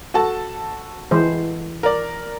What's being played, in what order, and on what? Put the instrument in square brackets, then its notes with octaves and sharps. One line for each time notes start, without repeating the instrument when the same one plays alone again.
[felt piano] F#4 A4 A5
[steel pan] E3 G#3 C5
[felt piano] A#4 D5